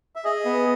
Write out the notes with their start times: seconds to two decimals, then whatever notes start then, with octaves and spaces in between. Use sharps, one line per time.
0.16 E5
0.24 G#4 D#5
0.45 B3